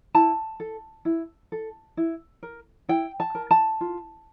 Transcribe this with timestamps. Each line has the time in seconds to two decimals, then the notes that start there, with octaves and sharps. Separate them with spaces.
0.15 E4 A5
0.60 A4
1.05 E4
1.52 A4
1.97 E4
2.43 A#4
2.89 E4 G5
3.20 A5
3.35 A#4
3.51 A5
3.81 F4